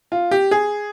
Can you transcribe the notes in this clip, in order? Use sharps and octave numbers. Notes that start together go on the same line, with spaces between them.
F4
G4
G#4